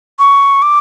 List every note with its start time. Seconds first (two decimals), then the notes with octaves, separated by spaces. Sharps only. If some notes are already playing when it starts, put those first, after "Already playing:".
0.19 C#6
0.62 D6